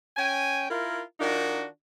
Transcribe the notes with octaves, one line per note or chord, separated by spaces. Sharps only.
C#4 G5 G#5
E4 F4 A#4
D#3 D4 D#4 F4 F#4